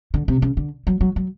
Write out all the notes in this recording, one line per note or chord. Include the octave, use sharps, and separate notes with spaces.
D3
C3
C#3
D3
F#3
F#3
F#3